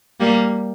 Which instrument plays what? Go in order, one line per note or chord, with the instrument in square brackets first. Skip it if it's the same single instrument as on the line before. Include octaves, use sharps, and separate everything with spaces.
[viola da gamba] G3 A#3